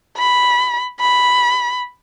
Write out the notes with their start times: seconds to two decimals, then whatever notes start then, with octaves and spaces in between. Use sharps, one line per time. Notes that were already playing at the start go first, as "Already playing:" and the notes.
0.17 B5
1.00 B5